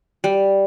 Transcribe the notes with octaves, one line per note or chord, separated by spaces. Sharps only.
G3